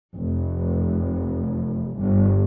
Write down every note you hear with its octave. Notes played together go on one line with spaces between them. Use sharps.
F1
G1